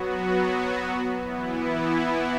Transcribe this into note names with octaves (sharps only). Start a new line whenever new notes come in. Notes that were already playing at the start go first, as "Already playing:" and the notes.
Already playing: F#3 B3 F#4
E3 B3 E4